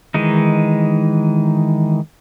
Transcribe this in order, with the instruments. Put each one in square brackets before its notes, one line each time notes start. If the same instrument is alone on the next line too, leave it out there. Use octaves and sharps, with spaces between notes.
[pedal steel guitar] D#3 E3 G#3 D#4